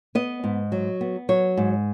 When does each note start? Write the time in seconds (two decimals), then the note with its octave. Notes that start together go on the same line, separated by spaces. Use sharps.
0.15 B3 D#5
0.44 G#2
0.72 F#3
1.01 B3
1.29 F#3 C#5
1.57 G#2